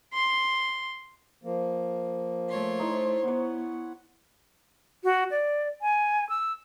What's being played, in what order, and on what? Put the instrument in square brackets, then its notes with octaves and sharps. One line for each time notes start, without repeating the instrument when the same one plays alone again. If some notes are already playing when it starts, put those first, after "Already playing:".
[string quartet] C6
[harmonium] F3 A#3
[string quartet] A3 C#5 C6
[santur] D#4 E4 C5
[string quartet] B3 [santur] E4 C#5 [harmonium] F#5
[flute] F#4
D5
G#5
E6